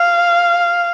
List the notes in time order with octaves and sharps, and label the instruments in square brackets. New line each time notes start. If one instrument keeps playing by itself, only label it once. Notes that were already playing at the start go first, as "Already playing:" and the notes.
Already playing: [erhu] F5